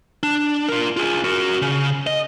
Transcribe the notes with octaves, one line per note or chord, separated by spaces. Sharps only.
D4
F4 A#4
F4 G#4
F#4 A#4
C#3
D#5